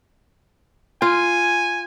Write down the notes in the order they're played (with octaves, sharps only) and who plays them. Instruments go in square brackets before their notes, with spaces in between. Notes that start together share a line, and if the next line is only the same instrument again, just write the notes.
[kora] F4 [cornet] G#5